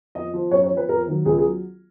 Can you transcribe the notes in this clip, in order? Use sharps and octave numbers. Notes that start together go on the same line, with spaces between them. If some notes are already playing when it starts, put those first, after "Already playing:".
F2 D#5
F3
F#2 C#5
C#5
F3
B4
F2 A#4
D#3 F#3
C#2 G#4
G#4
F#3